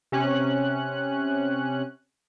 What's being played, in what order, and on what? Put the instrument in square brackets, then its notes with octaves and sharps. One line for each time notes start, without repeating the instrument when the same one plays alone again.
[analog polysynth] C3 C#4 F#6